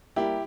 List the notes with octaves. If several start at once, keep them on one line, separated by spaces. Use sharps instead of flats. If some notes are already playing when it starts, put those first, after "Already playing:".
G3 A#3 E4 G4